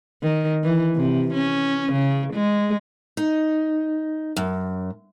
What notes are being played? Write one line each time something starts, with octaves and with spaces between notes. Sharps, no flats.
D#3
E3
C3
C#4
C#3
G#3
D#4
F#2